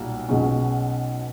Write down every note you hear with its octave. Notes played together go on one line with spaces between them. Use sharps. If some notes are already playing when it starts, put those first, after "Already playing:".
Already playing: B1 A#2 G3
B1 B2 G#3 C#4 F4